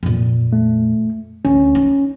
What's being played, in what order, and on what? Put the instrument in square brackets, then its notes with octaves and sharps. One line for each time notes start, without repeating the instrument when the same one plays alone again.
[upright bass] F2 A#2
[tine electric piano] A3
[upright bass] D2 [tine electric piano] C#4
[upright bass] D#4